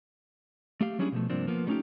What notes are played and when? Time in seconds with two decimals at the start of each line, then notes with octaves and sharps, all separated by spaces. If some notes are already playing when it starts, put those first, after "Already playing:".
0.81 A3 G4 F5
0.99 F#3 G3 C#4 D4 E4 G#4
1.12 B2 F3 A3
1.30 G2 C3 F3 A#3 C4 D4
1.47 F3 A#3 B3
1.67 G3 A3 C#4 D#4 F4 G4